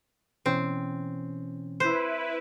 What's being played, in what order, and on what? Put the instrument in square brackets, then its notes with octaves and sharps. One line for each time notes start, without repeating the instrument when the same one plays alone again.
[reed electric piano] B2 E3 C#4 [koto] C4
[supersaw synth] E4 B4 [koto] C5